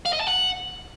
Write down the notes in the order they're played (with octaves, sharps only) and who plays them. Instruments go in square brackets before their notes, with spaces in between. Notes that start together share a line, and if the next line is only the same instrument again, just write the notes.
[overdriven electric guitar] F5
D#5
A5
F#5